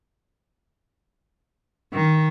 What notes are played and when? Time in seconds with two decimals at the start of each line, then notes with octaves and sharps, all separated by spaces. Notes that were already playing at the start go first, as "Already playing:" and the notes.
1.93 D#3